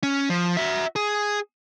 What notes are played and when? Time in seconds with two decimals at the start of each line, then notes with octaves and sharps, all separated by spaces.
0.03 C#4
0.30 F3
0.57 F#4 E5
0.96 G#4